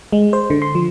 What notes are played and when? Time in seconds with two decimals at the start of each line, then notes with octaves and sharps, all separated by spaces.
0.13 G#3
0.33 C5
0.50 D3
0.62 C6
0.75 F3